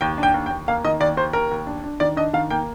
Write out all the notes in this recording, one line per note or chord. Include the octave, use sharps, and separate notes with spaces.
D#2 G5
D4
G5
D#2
G5
D#2
A#3 F5
D#3 D#5
D#2 D5
D#2 C5
D#2 A#4
D#2
D4
D4
D#3 D5
D4 D#5
D#3 F5
A#3 G5